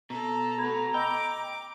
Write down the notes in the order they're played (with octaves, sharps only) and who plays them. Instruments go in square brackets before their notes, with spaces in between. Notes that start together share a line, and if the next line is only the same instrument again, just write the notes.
[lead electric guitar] B2 [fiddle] A4 [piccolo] A#5
[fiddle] A3 B3 [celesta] A4 B5 G#6
[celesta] D#5 B5 E6 [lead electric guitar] G5 [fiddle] D6